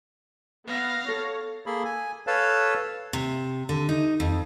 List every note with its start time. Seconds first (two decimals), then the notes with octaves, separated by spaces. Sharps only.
0.67 B3 F5 A#6
1.08 A4 C#5
1.66 A#3 G#4 A4 B5
1.85 G#5
2.27 A4 B4 C#5 F5 A5
3.13 C3
3.69 D3
3.89 D#4
4.20 F2